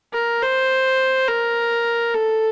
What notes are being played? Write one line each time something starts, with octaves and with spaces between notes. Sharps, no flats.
A#4
C5
A#4
A4